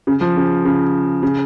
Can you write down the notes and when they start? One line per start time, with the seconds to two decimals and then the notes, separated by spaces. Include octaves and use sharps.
0.07 C#3
0.21 F3
0.36 C#3
0.65 C#3
1.23 C#3